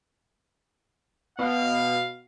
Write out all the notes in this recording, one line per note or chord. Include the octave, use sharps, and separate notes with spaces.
B2 F5